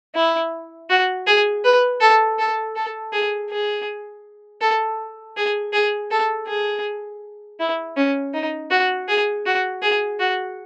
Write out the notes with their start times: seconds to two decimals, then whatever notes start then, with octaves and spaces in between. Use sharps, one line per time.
0.15 E4
0.90 F#4
1.27 G#4
1.64 B4
2.01 A4
2.39 A4
2.76 A4
3.13 G#4
3.50 G#4
4.61 A4
5.36 G#4
5.73 G#4
6.11 A4
6.47 G#4
7.59 E4
7.96 C#4
8.34 D#4
8.71 F#4
9.08 G#4
9.46 F#4
9.82 G#4
10.20 F#4